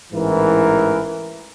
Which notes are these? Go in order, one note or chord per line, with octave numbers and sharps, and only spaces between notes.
A1 G#2 E3 A#4